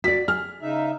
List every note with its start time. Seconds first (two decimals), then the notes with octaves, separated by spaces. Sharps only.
0.04 F#4 D5 B6
0.28 G#4 F6
0.62 C#3 D#4 E5